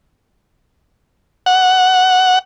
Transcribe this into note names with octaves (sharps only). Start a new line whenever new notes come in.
F#5